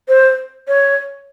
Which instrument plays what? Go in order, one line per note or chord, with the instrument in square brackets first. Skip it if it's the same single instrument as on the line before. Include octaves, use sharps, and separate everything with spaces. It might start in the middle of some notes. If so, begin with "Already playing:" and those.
[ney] C5
C#5